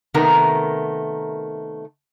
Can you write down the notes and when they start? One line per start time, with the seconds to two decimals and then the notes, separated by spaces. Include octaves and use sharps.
0.14 C3 D#3 A3 B3 A#4